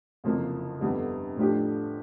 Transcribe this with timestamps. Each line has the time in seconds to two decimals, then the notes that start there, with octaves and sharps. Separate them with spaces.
0.24 F#1 F2 C3 F3 A#3
0.80 G1 F2 D3 G3 B3
1.36 A2 F3 A3 D4 G4